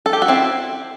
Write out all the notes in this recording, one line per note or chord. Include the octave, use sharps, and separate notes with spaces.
A4
G4
F#4
C4 E4